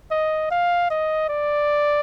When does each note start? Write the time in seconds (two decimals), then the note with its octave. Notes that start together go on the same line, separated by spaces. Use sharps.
0.11 D#5
0.51 F5
0.90 D#5
1.29 D5